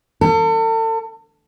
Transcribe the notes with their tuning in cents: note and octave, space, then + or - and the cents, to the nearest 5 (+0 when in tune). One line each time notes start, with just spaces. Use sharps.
A4 +40